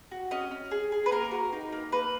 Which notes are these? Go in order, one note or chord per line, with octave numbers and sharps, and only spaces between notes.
F#4
C#4 D#5
C#4
G#4
G#4
B4
A#3 A#4
F#4
D#4
A#3
A#3 B4